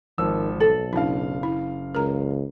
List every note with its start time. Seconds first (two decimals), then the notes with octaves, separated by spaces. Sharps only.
0.18 G#1 D#3 F3 E6
0.60 B1 A4 F#7
0.93 F#1 D4 E4 F5
1.43 E4
1.95 C#2 A#4 A#5